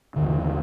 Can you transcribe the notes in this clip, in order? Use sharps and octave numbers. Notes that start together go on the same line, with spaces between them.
D#2 D3 D#3
D#3
E3